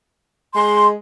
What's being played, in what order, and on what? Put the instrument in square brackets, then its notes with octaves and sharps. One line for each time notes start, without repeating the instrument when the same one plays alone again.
[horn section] G#3 [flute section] C6